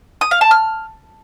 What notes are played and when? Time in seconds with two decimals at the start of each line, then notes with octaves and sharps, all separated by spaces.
0.21 D#6
0.31 F5
0.41 A5
0.51 F6